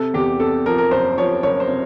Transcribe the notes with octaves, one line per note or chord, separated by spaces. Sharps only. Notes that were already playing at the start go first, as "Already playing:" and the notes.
Already playing: C3 A4
E2 G4
C3 A4
F3 A#4
A#4
F#1 C5
F3 C#5
F#1 C#5
C5
C3